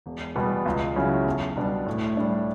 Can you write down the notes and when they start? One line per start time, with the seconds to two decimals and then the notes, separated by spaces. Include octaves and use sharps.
0.06 E1
0.36 E2 B2 G3 B3
0.66 C#2
0.96 C#3 F#3 C#4 E4
1.26 B1
1.57 B2 G3 D4
1.86 A2
2.17 G3 D4